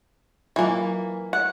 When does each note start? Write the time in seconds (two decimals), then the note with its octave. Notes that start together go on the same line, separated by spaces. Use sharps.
0.56 E3 F#3 A#3 F4 G#5
1.33 F#5